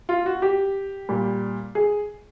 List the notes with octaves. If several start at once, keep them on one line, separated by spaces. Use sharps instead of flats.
F4
F#4
G4
A#2 G3
G#4